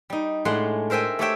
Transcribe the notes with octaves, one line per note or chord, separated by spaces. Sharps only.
G3 D#4
A2 G#3 A3 D4 F#5 C6
A#4 C5 E5 G5 G#5
A3 G4 C5 C#5 E5 G5